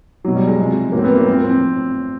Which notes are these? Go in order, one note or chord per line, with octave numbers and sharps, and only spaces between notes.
B2 F#3
G3
G#3
C3 F3
A2 F#3 A#3
C4
B3
A#3
A2 F3 C4
C4